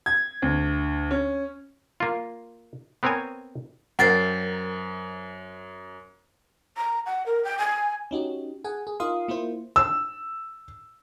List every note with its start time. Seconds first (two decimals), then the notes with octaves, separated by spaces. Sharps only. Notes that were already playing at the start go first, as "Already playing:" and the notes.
0.06 G#6
0.42 D2
1.11 C#4
2.00 A#3 F4
3.03 B3 C4 A#4 C#5 G#5
3.99 F#2 A#4 C5 F#5 G5 A6 C7
6.77 A#5
7.06 F#5
7.26 A#4
7.44 G5
7.59 G#5
8.11 C#4 D#4 F#4 G4
8.64 G#4 F#5 G#5
8.87 G#4
9.00 D#4 F4 A#4 F5 C6 D#6
9.28 A#3 E4 F4 C5
9.76 E6